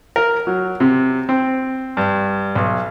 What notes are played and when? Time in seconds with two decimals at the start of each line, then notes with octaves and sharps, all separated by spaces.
0.16 A#4
0.47 F#3
0.80 C3
1.29 C4
1.97 G2
2.55 B1